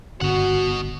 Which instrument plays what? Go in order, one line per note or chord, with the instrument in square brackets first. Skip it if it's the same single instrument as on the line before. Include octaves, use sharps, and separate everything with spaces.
[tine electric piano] G1 [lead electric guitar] B2 F#5 [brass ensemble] F#4